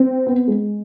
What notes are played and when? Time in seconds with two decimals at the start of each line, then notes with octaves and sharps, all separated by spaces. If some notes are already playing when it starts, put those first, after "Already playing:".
Already playing: C4
0.26 B3
0.48 G#3